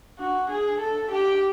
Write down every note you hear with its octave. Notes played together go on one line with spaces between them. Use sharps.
D4 F#4
G#4
A4
G4